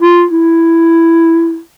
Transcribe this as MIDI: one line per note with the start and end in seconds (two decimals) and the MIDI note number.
0.01 0.25 65
0.31 1.60 64